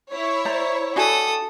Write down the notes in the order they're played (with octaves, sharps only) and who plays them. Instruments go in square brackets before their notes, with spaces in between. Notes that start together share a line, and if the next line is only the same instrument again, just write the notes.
[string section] E4 C#5
[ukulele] C5 D5 A#5
[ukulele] D4 F#4 G#5 [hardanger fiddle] A4 D#6